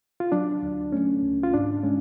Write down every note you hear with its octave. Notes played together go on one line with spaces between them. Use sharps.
F4
F#3 D4
D2
A3 C#4
C#2
F4
G#2 D4
G#3 C#4